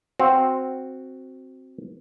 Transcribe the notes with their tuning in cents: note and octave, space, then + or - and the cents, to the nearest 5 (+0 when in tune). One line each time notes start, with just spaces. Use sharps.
C4 +0 F#4 +0 F5 +0